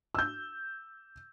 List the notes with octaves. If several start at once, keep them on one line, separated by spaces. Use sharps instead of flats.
E6 G6